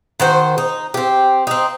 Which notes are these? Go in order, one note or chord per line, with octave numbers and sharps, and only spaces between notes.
D#3 F#4 C5
D#4
C4 G4
C4 D#4